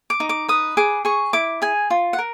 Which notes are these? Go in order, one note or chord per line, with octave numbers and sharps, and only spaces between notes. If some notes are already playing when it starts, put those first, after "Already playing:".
D6
D#4
D6
B4 D#6
G#4 D6
G#4 C#6
E4 D6
G#4 G#5
F4
F#5
A#4